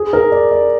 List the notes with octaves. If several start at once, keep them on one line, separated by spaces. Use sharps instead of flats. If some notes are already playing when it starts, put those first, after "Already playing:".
Already playing: G#4
A#4
D5
D5